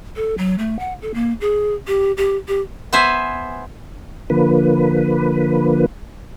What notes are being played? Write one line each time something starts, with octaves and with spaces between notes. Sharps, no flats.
A4
F#3
A3
F#5
A4
A#3
G#4
G4
G4
G4
B3 B4 C5 E5 G#5
D3 F3 A#3 B4